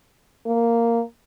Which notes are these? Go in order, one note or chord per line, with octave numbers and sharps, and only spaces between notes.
A#3